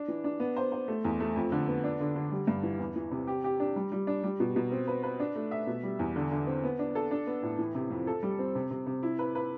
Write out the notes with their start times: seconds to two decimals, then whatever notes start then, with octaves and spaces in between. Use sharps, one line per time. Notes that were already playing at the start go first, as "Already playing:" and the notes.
Already playing: D4
0.08 E3
0.24 D4
0.40 B3
0.56 C5
0.72 C5
0.88 A3
1.04 E2
1.20 A3
1.36 F2
1.52 D3
1.68 B3
1.84 D4
2.00 D3
2.15 D3
2.31 G3
2.47 G2
2.63 E3
2.79 E2
2.96 E3
3.11 C3
3.27 G4
3.44 G4
3.60 D4
3.76 G3
3.92 G3
4.07 D4
4.24 G3
4.40 B2
4.56 B2
4.72 C4
4.87 B4
5.03 B4
5.20 D4
5.36 A3
5.51 E5
5.67 B2
5.83 G3
5.99 E2
6.16 D3
6.31 D3
6.47 C4
6.64 B3
6.79 D4
6.95 A4
7.11 D4
7.27 B3
7.42 A2
7.59 E3
7.75 C3
7.91 F2
8.07 A4
8.23 G3
8.39 C4
8.55 C3
8.71 C3
8.87 C3
9.03 E4
9.19 B4
9.35 B4